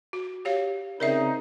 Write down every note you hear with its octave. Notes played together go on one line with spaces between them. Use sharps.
F#4
G4 C#5 F5
C#3 C4 D#4 A#4 D5 E5